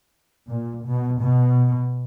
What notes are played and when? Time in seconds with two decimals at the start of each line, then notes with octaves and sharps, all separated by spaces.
0.46 A#2
0.84 B2
1.21 B2